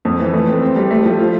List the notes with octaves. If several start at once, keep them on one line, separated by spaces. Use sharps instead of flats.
F2
E3
A3
C4
C4
G3
A3
F3
F4